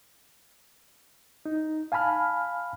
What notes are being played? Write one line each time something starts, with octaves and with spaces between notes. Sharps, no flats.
D#4
F5 G#5 A5 B5 F6